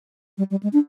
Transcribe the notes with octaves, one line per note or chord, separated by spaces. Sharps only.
G3
G3
G#3
D4